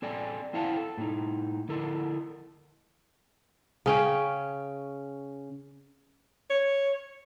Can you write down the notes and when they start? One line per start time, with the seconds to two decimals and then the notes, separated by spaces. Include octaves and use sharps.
0.02 C4 A4 D5 G#5
0.53 C4 E4 C5 F5 F#5 A5
0.77 A4
0.98 A2 D#4
1.69 D3 E4 A4 A#4
3.86 C#3 C#4 G5
6.50 C#5